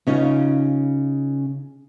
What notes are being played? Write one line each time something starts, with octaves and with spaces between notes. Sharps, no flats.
C#3 C#4 D#4 F4